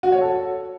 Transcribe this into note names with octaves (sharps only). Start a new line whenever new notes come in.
F#4
C#5
A4